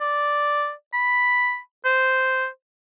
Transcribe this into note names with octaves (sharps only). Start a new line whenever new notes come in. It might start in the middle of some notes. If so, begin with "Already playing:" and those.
D5
B5
C5